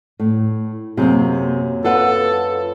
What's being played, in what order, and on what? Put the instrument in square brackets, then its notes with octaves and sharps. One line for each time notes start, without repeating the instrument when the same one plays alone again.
[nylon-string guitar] A2
[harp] F#2 A#3 [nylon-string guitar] C3 G#4
[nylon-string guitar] F4 B4 F#5 [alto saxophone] A4